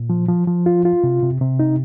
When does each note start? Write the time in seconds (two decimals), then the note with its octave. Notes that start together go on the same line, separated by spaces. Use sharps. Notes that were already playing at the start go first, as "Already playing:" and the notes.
Already playing: A#2
0.10 F3
0.28 F3
0.47 F3
0.66 F4
0.85 F4
1.04 C3
1.23 C3
1.41 C3
1.60 D#4